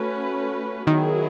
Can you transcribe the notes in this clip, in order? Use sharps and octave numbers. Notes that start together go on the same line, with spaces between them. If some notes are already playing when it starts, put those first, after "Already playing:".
Already playing: A3 C#4 F#4 B4
D#3 F#3 B3 E4 G#4